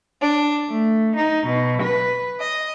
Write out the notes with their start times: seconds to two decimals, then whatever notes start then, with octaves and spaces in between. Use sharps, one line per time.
0.23 D4
0.68 A3
1.16 D#4
1.47 B2
1.83 B4
2.41 D#5